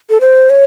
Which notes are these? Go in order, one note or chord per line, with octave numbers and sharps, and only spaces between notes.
A4
C5
C#5